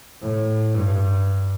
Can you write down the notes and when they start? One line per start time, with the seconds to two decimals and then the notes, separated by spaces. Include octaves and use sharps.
0.22 A2
0.75 G2